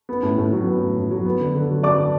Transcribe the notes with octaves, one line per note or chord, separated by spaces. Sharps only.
B3
A2
A2
F#3
B3
A2
A2
F#3
B3
D3
D3
F#3
B3 D5 D6
D3